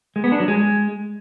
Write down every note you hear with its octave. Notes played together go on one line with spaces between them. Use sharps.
G#3
B3
D4
F#3
G#3